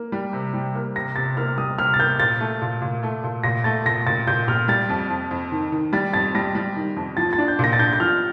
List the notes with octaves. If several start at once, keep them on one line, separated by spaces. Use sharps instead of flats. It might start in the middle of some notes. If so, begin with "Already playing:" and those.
Already playing: A#3
G3
C3
G3
A#3
C3 A#6
C3 A6
A#3 F6
G3 D#6
C3 F6
A6
A#3 G6
A#2 A6
A3
A#2
A#2
A3
A#2
A#2 A#6
A3 A6
A#2 A#6
A#2 A6
A#2 G6
A#2 F6
G3 A6
F2
F2
F2
D#3
D#3
G3 A6
F2 A6
G3 A#6
G3
D#3
F2
F3 A6
A6
D4
G6
A#2 A#6
A6
D4 G6
G6
F3 F6